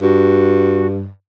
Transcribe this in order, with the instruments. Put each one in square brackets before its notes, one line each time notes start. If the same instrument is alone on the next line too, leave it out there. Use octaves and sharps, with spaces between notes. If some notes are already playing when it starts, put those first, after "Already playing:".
[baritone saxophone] G2 [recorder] F#4